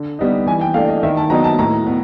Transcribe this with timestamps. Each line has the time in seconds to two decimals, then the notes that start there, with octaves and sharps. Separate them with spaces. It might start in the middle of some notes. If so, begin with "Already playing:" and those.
Already playing: D3
0.19 G3 B3 D#4
0.46 E3 G#5
0.61 G5
0.74 A3 D4 F5
0.88 D#5
1.03 D#3 E5
1.17 A5
1.30 F#3 B3 D#4 A#5
1.44 A5
1.59 A2 A#5
1.87 B3